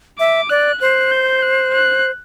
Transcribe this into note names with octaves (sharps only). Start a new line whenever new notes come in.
E5 D6
D5 F#6
C5 F#6
G6
F#6
F#6